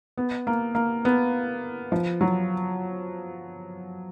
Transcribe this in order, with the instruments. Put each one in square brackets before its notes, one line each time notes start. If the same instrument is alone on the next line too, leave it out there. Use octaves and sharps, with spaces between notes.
[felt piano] B3
A#3
A#3
B3
F3
F#3